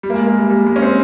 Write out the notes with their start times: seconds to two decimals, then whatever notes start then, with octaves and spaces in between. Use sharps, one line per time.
0.03 G3
0.10 A#3
0.14 G#3
0.27 A#3
0.38 G3
0.50 G3
0.66 G#3
0.76 C#4
0.82 C4